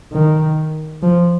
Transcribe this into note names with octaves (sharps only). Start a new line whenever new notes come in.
D#3
F3